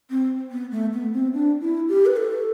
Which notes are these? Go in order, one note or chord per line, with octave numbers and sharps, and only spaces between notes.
C4
B3
A3
B3
C4
D4
E4
G4
B4
A4